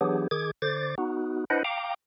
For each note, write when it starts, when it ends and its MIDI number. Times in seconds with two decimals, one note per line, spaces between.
0.01 0.28 52
0.01 0.28 54
0.01 0.28 59
0.01 0.28 62
0.01 0.28 67
0.01 0.28 68
0.31 0.51 51
0.31 0.51 68
0.31 0.51 86
0.31 0.51 92
0.62 0.95 50
0.62 0.95 72
0.62 0.95 86
0.62 0.95 93
0.98 1.45 59
0.98 1.45 63
0.98 1.45 66
1.50 1.63 62
1.50 1.63 64
1.50 1.63 71
1.50 1.63 72
1.50 1.63 75
1.50 1.63 78
1.64 1.94 77
1.64 1.94 79
1.64 1.94 82
1.64 1.94 86